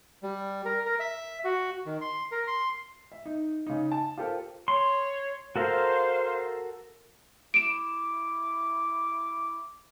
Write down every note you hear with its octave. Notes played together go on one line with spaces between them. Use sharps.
G3
A#4
A#4
E5
F#4
D#3
C6
A#4
C6
E5
D#4
C#3 D#4
A5
F4 G4 A4 A#4 C5 G5
C#5 C6
F#4 A4 A#4 C5 F5
E4 E5 D6 D7 E7